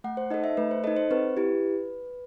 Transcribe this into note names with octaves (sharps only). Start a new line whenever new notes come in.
A3 F#5
C5
D#4 A4 D#5
E5
A3 B4
C5
D#4 A4 D#5
C5
C4 B4
E4 G4